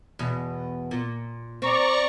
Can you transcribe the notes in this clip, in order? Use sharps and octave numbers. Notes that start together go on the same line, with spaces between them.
E2 B2
A#2
C4 D5 A#5 C#6